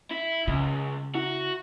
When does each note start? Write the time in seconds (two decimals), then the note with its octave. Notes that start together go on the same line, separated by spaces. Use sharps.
0.11 E4
0.48 C#2 C#3
1.15 E4 F#4